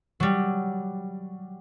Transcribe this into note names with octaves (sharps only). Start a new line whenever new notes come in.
F#3 G3